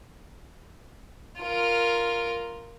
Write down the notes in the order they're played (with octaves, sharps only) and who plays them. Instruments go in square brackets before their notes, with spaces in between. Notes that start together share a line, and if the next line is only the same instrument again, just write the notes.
[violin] F4 A#4